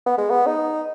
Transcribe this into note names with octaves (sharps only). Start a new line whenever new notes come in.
B3
G#3
B3
D#4